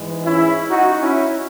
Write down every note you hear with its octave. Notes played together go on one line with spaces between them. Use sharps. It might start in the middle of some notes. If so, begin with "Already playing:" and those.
Already playing: G#2 E3 G#3
C#4 E4
D#4 F#4
C#4 E4